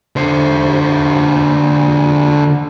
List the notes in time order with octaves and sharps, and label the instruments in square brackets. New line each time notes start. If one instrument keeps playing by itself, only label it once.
[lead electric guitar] D3 C5